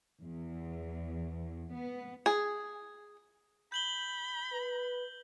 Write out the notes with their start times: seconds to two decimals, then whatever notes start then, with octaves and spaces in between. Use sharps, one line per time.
0.21 E2
1.73 B3
2.26 G#4
3.72 B5 G6 F#7 G7
4.53 B4